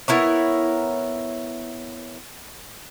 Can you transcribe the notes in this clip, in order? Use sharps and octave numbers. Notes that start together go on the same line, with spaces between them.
B3 E4 A#4 C#5